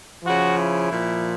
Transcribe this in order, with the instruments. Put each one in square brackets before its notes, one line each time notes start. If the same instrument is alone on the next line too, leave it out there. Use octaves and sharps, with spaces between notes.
[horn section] C#3 F3 F#4
E4
A#2 F3